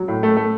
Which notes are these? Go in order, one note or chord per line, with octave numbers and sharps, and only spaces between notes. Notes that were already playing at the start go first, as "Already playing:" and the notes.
Already playing: F#3
A2
A3
A3